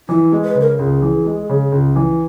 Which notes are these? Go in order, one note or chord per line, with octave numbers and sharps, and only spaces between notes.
E3 E4
G#3
B4
C#3
A#4
C#2 G#4
E3
G#3
C#3
C#2
E3